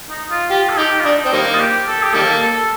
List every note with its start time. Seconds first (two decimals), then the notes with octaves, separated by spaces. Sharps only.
0.10 D#4
0.31 F4
0.51 F4 G4
0.69 A4
0.78 D#4 G4
1.00 F4
1.06 D4 D#4
1.25 C4
1.33 D#3 G3 A#3 D#4
1.55 F4
1.60 G4
1.87 A4
2.03 G4
2.14 D#3 G3 A#3 A4
2.41 A4